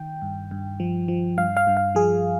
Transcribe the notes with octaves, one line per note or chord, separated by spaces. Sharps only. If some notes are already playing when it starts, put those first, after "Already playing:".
Already playing: D#3 G5
G2
G2
F3
F3
G2 F5
F5
G2
F5
F3 G#4